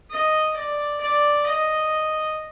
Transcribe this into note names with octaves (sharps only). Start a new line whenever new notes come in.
D#5
D5
D5
D#5